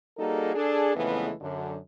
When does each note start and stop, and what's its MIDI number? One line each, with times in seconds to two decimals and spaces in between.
0.18 0.52 55
0.18 0.52 58
0.18 0.52 63
0.18 0.52 66
0.18 0.52 68
0.18 0.52 69
0.55 0.93 62
0.55 0.93 68
0.55 0.93 69
0.95 1.32 41
0.95 1.32 49
0.95 1.32 52
0.95 1.32 56
0.95 1.32 57
0.95 1.32 59
1.41 1.77 42
1.41 1.77 50